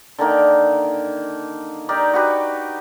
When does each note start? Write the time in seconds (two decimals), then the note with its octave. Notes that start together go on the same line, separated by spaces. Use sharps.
0.19 D3 D#3 A#3 D#4
1.89 D#4 G4 A#4 D5
2.14 F#4 G4 B4